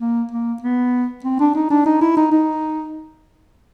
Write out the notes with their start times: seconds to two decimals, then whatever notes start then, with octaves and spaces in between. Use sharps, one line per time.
0.01 A#3
0.31 A#3
0.62 B3
1.24 C4
1.40 D4
1.55 D#4
1.70 D4
1.86 D#4
2.01 E4
2.17 D#4
2.32 D#4